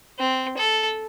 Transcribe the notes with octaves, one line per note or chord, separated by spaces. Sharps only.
C4
A4